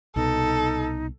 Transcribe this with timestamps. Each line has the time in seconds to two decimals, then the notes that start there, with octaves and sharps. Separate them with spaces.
0.16 C2 B2 D#4 A4